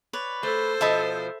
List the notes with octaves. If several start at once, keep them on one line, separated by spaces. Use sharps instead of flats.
B4 C#5 D5
A3 A4 C5
B2 F3 D#5 E5 A5 B5